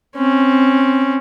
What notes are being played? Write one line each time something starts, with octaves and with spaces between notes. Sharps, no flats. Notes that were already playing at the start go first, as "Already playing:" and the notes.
C4 C#4